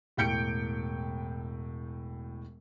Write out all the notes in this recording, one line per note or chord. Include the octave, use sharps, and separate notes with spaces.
E1 A2 G5 G6 C#7 D7